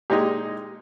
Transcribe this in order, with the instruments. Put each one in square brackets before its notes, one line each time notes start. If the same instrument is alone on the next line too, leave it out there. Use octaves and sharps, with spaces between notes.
[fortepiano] A#2 G#3 D#4 [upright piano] G4